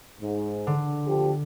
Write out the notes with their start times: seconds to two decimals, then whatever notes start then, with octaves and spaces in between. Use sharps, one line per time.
0.21 G#2
0.67 D3
1.07 D2 F3 G4